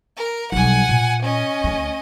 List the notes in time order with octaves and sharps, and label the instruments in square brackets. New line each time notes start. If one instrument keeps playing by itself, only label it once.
[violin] A#4
[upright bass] B1 G3 [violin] F#5 G#5
[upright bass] A#2
[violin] C#4 D#5
[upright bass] D2 A3